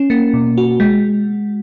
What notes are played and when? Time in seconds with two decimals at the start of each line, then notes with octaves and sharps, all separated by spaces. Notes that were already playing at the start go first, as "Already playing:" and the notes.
Already playing: C#4
0.10 A#3
0.34 B2
0.58 F#4
0.80 G#3